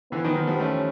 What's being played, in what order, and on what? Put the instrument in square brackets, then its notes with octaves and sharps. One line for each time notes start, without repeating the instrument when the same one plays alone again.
[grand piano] D3 E3 [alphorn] B3
[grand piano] D#3 F3
D#3 F3
F3 G3
[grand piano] G3 A3 [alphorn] C#4